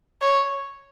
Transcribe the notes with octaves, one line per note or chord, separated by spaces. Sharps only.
C#5